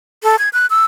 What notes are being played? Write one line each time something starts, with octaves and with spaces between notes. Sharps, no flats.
A4
G#6
F#6
E6